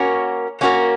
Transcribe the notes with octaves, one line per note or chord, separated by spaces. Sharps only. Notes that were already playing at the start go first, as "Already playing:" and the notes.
Already playing: A#3 C#4 F#4 A#4
A#3 C#4 F#4 A#4